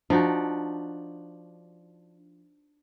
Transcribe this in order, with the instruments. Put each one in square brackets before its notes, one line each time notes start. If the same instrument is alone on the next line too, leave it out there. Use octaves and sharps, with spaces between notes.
[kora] F3 D#4 F#4 [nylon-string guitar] D4